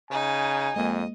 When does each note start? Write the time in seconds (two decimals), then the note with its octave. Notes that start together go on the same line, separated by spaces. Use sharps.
0.11 C#3 D#4 G#5
0.76 F2 G#3 A#3 D#5